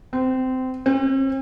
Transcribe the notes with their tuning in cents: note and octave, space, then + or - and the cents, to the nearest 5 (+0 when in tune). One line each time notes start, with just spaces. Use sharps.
C4 -20
C4 +45